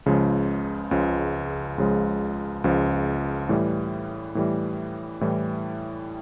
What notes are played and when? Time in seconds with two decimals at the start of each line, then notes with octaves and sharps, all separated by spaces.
0.06 C#2 C#3 F3 G#3
0.91 C#2 C#3 F3 G#3
1.78 C#2 C#3 F3 G#3
2.64 C#2 C#3 F3 G#3
3.49 A2 E3 G3
4.35 A2 E3 G3
5.21 A2 E3 G3